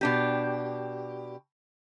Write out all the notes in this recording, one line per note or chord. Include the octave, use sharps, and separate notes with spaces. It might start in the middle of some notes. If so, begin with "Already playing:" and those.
B2 D4 G4